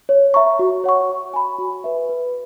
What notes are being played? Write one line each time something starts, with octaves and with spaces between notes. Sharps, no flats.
C#5
E5 A#5 C#6
F#4
C#5 F#5 C#6
C#5
G#5 B5
F#4
B4 E5
B4